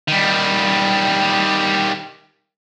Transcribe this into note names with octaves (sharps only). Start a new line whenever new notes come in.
D#3 G3